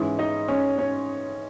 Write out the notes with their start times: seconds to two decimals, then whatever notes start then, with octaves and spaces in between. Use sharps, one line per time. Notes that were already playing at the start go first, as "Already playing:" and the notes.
Already playing: G#2 E3 G#3 C#4 E4
0.19 D#4 D#5
0.48 C#4 C#5
0.78 C#4 C#5